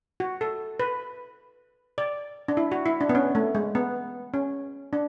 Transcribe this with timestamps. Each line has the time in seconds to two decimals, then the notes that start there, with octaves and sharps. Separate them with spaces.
0.20 F#4
0.41 A4
0.80 B4
1.98 D5
2.48 D4
2.57 E4
2.72 F#4
2.86 E4
3.01 D4
3.09 B3
3.15 C#4
3.35 A3
3.55 G#3
3.75 B3
4.34 C#4
4.93 D4